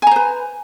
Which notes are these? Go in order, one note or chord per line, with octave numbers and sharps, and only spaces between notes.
B4 C5 G#5 A#5